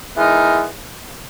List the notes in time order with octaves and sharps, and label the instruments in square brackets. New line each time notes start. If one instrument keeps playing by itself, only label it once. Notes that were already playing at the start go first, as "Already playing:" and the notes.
[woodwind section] E3 G#3 B3 D#4 A#4